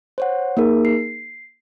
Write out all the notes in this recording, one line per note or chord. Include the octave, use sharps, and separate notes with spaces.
C5 C#5 F#5
A#3 D#4 G#4 A#4
C7